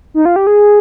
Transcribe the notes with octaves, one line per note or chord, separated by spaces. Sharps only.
D#4
F4
G4
G#4